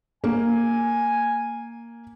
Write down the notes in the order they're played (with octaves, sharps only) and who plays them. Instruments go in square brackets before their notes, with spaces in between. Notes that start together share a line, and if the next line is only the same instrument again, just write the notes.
[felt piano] A#3 [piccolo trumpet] G#5